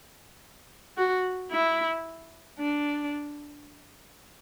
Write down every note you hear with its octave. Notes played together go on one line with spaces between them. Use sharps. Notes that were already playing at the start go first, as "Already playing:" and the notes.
F#4
E4
D4